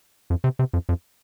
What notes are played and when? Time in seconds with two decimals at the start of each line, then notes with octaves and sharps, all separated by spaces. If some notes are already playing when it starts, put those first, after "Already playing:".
0.30 F2
0.44 C3
0.59 C3
0.73 F2
0.89 F2